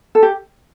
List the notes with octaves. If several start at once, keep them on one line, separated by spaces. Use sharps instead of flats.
A4
G4